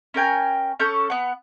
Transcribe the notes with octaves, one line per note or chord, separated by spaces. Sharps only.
C#4 A#4 G5 G#5
C#4 A4 C#6 G6
B3 F#5